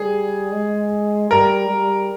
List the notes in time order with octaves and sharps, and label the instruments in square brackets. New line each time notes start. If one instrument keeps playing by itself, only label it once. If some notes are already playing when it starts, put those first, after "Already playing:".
Already playing: [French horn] G3 [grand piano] G#4
[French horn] G#3
[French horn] G3 [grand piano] A#4
[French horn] G3